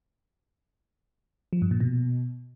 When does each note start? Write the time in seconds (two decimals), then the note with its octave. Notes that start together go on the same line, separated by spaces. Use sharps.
1.53 F3
1.62 G2
1.71 A#2
1.80 B2